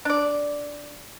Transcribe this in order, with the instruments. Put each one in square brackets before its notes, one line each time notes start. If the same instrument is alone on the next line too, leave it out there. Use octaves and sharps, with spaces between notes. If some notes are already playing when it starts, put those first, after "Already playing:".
[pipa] D4 D5